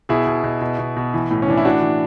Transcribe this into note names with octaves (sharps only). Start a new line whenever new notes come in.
B2 E4 G#4
B2
B2
B2
B2
B2
E3
A2
C#4
E3 D4
E4
A2 D4 F#4
E3